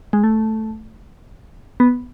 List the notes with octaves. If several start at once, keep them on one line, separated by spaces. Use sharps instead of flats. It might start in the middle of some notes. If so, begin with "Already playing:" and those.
G#3
A3
B3